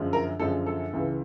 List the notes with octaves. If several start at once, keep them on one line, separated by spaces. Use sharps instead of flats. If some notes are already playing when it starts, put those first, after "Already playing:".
Already playing: F#2 D3 F3 G#3
A#4
F#2 D3 F3 G#3 A4
A4
C#2 C#3 E3